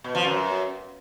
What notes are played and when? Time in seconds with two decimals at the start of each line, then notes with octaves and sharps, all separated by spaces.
0.04 B2
0.15 F3
0.25 F#2